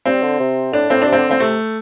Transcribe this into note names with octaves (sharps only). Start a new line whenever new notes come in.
G3 C4
D3
C3
A2 D4
A2 C4
C3 D4
C4
D3
D3 C4
C3 A3